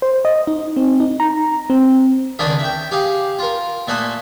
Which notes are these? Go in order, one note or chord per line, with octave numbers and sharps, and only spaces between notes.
C5
D#5
D#4
C4
D#4
A#5
C4
C#2 D3 D#3 D4 G#4 B5
E5 G5
G4 G#4 F5
F4 A#4
A#2 A3 E5 F#5 G#5 D#6